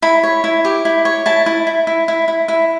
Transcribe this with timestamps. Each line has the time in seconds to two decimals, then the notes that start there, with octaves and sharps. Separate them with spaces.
0.02 E4 B5
0.23 C#5
0.44 E4
0.65 G4
0.85 E4
1.05 C#5
1.26 E4 A5
1.46 E4
1.67 E4
1.87 E4
2.08 E4
2.28 E4
2.48 E4